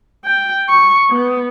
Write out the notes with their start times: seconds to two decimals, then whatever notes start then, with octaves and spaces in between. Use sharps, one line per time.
0.25 G5
0.69 C#6
1.10 B3